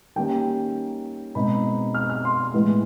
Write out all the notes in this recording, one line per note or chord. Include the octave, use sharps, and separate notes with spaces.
D#3 G3 A#3 C#4 G5
B2 G#3 C4 D#4 B5
F6
F6
C6
A2 E3 G#3 B3